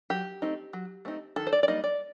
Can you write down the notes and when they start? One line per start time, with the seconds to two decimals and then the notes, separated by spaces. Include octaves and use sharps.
0.10 F#3 G4
0.42 A3 C4 D#4
0.73 F#3
1.05 A3 C4 D#4
1.36 D#3 A4
1.47 C5
1.53 D5
1.63 D5
1.68 G3 A#3 D#4 D#5
1.84 D5